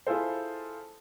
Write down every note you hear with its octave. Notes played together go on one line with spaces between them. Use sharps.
E4 F4 G#4 A4 C5